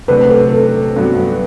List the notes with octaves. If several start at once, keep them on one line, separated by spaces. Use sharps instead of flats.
C3 F#3 A3 D4 F#4 B4
A4
A4
G2 F#3 B3 F#4